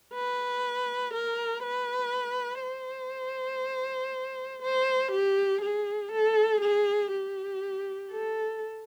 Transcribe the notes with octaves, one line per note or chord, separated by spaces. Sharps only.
B4
A#4
B4
C5
C5
G4
G#4
A4
G#4
G4
A4